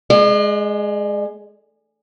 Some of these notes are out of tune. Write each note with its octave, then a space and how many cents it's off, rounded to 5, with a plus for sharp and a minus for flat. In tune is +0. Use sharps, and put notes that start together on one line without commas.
G#3 +10 D5 +45